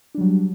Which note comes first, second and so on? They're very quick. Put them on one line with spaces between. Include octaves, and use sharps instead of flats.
D4 G3 F#3